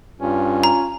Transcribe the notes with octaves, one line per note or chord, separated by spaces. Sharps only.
G2 C#4 F4
A#5